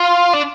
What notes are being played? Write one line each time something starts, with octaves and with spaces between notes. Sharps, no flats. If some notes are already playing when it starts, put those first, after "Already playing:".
Already playing: F4
D4